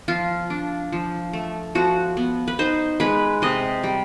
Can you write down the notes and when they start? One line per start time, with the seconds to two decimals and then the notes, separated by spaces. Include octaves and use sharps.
0.08 F3 F4
0.50 D4
0.93 F3
1.33 A3
1.75 F3 F#4
2.17 B3
2.48 B4
2.59 D#4 C5
3.00 G#3 B4
3.42 C3 D#5
3.83 G3